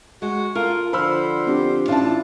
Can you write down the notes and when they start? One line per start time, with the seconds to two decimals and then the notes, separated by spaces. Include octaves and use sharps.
0.22 G#3 F#4
0.55 F4 A4 A#4
0.93 D3 F3 C5 B5 E6 F6
1.47 C4 D4 G4
1.88 A1 D4 E4 F4 F5 A5